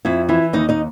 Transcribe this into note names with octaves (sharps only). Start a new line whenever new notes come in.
F2 E4 E5
E3 E4 E5
D#2 D#4 D#5
D#4 D#5